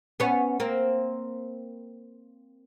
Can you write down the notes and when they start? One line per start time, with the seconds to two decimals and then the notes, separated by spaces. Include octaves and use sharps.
0.20 B3 C#4
0.60 A#3 C4